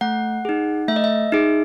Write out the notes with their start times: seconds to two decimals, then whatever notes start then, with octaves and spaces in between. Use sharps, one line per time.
0.01 A3 F#5
0.45 D#4 G#4
0.88 A3 E5
0.96 D#5
1.04 E5
1.32 D#4 G#4